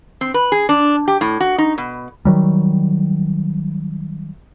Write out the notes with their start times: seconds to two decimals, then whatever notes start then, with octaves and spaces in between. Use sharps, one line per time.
0.21 C4
0.34 B4
0.52 G#4
0.69 D4
1.08 G4
1.21 A2
1.40 F#4
1.58 D#4
1.78 B2
2.25 D#3 F#3 G3